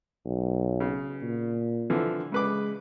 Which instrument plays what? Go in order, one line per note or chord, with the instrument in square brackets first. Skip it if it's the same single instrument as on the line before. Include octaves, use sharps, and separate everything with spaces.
[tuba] B1
[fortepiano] C#3
[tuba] A#2
[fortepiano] D3 E3 F3
[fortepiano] C#3 B4 D6 [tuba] G#3